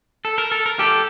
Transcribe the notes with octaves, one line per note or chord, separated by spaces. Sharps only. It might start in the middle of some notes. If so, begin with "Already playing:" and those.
A4
A#4
A4
A#4
G4 A4